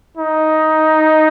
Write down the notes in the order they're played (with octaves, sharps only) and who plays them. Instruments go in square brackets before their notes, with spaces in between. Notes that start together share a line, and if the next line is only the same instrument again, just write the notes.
[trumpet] D#4